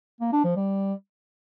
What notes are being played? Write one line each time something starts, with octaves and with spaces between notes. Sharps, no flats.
A#3
D4
F3
G3